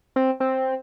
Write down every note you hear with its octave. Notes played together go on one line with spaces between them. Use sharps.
C4
C4